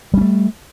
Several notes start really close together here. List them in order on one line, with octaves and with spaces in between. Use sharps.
G3 C#4 A3